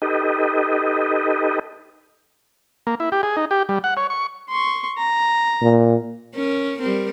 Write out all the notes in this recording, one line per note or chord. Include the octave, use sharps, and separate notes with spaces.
D#4 G4 A4 B4 D#5
A#3
E4
G4
G#4
D#4
G4
G3
F#5
C#5
C#6
C6 C#6
A#5
A#2
C#4 A#4
G3 C4 A#4